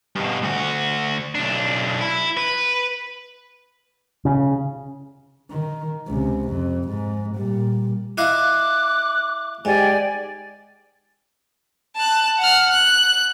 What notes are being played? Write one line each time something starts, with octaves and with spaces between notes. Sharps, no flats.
G2 B2
D2 F#4
B1 D4
E4
B4
C#3
D#3
C#2 C3
F2
G#2
A#2 G3
E4 D#5 F5 D6 F#6
G#2 G4 D5 G#5
A5 F#6
F#5 F6
F#6